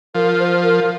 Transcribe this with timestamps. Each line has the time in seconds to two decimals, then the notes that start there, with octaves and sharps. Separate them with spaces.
0.15 F3 A#4
0.40 C5
0.63 A#4